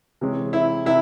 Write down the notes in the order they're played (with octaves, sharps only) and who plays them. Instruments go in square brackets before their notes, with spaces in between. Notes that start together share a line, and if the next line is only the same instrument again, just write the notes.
[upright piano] C3 E3 G#3 C#4
[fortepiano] E4
[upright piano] C3 [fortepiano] E4